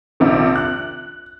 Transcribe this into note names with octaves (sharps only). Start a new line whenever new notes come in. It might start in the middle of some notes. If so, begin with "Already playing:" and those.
A#1 C3 D#3
F#6